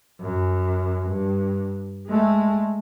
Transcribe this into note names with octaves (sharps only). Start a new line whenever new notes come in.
F#2
G2
G#3 A3